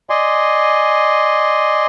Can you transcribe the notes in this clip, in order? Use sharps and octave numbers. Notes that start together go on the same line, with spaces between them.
D5 D#5 G#5 C6